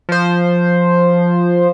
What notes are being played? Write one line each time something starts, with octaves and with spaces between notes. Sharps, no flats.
F3 C5